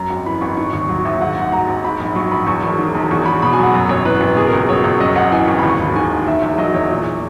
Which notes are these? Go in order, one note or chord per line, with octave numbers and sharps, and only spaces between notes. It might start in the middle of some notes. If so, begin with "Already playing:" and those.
Already playing: F#2 A#5
G#1
E3 B5
G#1 C#6
D#3 C#6
D#2 C#6
F#3 C#6
D#2 E5
G#2 F#5
F#5
G#1
F#5
F#3 A#5
G#1
G#2 B5
A#1
F#3 C#6
A#1 B5
E2 C#6
E1
D#3
E1
E2 C#6
E1 B5
B2 B5
G#5
F#3 F#5
F#2
G#1 C#5
E3 B4
G#1
B2 G#4
A#4
C#2
A#4
F#3 C#5
C#2
F#2 D#5
G#1 F#5
E3 G#5
G#1 C#6
D#2 B5
C#6
E1
D#3 G#5
E1
D#3 E5
E2 E5
F#3 D#5
E2 C#5
A#2